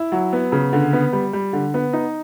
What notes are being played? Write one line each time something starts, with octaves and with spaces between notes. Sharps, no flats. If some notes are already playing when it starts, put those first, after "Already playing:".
Already playing: E4
F#3
B3
C#3
D3
B3
G3
G3
D3
B3
D#4